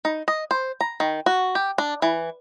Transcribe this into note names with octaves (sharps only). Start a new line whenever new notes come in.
D#4
D#5
C5
A#5
D#3
F#4
G4
D4
E3